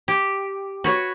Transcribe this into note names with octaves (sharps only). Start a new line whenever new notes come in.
G4
F#4 B4 C#5